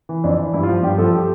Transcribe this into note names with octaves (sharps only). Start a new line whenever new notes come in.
E3
F2 D4
E3
G2 E4
F4
F3
G2 G4
F3 A4
G4